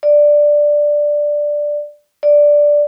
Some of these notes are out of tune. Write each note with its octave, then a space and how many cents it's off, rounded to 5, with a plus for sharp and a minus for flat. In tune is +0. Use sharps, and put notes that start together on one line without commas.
D5 +5
D5 +0